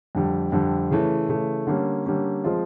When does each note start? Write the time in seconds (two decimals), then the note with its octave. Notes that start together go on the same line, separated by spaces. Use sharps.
0.15 F2 D3 G3
0.52 F2 D3 G3
0.91 C#3 E3 A3
1.29 C#3 E3 A3
1.67 D3 G3 A#3 C#4
2.06 D3 G3 A#3 C#4
2.44 F3 G#3 C4 F4